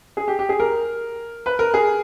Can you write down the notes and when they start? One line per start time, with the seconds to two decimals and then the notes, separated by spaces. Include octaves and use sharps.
0.17 G#4
0.28 G4
0.39 G4
0.49 G#4
0.60 A#4
1.46 B4
1.59 A#4
1.74 G#4